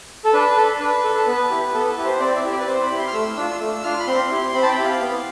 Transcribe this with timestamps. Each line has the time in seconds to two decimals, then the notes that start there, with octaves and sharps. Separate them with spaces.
0.25 A4
0.33 D4 B4
0.57 A4
0.80 D4 B4
1.04 A4
1.15 A4
1.27 B3 B4
1.50 E4 G4
1.74 B3 A4
1.89 B4
1.97 E4 G4
2.04 C5
2.20 C4 D5
2.35 E5
2.44 E4 G4
2.52 D5
2.59 B4
2.67 C4 C5
2.82 B5
2.90 E4 G4
2.98 C6
3.08 F6
3.13 A3 E6
3.37 D4 F4 E6
3.60 A3 E6
3.84 D4 F4 F6
4.00 B5
4.07 C4 C6
4.30 E4 G4
4.54 C4 B5
4.62 A5
4.69 G5
4.77 E4 G4
4.85 F5
5.00 B3